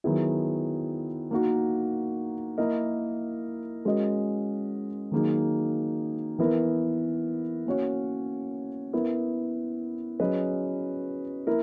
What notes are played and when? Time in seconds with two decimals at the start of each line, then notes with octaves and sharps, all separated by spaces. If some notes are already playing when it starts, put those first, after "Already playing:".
0.04 D#3 F#3 B3 E4 G#4
1.31 A#3 D#4 F#4 A#4
2.58 A#3 E4 A#4 D#5
3.85 G#3 C#4 F#4 A#4 D#5
5.11 D#3 F#3 A#3 D#4 G#4
6.38 E3 B3 E4 A#4
7.66 A#3 C#4 F#4 C#5
8.93 B3 E4 A#4
10.20 F#3 C#4 G#4 B4 D#5
11.47 A#3 E4 A#4